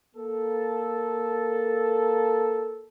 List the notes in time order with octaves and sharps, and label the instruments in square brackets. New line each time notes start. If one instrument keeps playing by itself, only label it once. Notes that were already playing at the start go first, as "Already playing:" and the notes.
[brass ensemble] A#3 A4